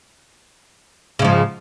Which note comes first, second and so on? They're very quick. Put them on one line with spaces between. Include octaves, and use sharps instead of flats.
C#3 G#2 F3